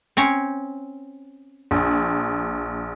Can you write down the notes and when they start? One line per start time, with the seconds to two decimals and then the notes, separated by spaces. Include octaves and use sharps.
0.17 C4 C#4 C#5
1.71 A#1